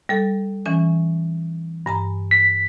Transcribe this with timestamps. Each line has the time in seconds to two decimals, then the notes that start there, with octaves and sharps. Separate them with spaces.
0.09 G3 A4
0.66 E3 C#4 G#5
1.86 G2 G#5 A#5
2.31 B6